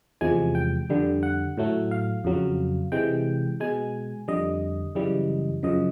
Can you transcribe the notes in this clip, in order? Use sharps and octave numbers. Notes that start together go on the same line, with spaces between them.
E2 C3 F3 G#3 G#5
G5
F2 D3 G3
F#5
A2 F#3 A3
F5
F2 C#3 F#3
C3 E3 G#3 G5
B2 G#3 G#5
F2 D3 G3 D#5
F#2 C#3 E3 G3
F#2 C#3 F3 D#5